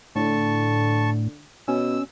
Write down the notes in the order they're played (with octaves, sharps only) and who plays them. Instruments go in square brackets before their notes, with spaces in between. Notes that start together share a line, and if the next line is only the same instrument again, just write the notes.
[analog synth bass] A2 [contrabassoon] D3 [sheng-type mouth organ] A5 C#6
[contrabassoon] B2 [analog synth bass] C#4 [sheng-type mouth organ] E6